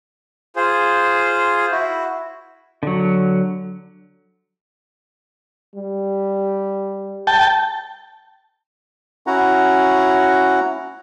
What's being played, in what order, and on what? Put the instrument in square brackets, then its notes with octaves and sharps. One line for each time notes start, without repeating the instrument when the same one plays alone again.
[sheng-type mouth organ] F4 G#4 C5
E4 F#4
[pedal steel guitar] D3 F#3
[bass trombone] G3
[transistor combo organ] G5 A5
[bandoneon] C#4 E4 F#4 F#5 A#5